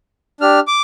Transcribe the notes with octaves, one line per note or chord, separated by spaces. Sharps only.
D4 G4 F6
D6